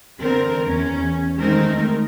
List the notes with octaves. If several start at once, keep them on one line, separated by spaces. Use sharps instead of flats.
D3 E3 B3 C4 A#4
E2 C#4
D#3 G#3 A3 C4 D#4 A#4